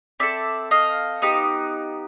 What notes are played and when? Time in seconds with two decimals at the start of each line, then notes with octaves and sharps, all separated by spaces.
0.20 C4 E4 A4 D5 E5
0.71 D#5 F5
1.22 B3 D#4 G4